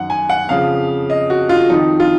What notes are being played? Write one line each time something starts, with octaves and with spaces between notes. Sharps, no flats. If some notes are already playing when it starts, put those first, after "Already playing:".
Already playing: F#2 D#3 F#5
G#5
F#5
F2 C#3 F3 F5
D#5
F#4
F4
F2 D#3 D#4
F4